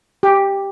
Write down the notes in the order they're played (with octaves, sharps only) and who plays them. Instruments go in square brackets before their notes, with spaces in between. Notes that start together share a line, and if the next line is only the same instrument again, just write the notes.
[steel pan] G4